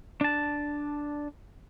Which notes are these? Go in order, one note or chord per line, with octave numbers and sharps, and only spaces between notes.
D4 A5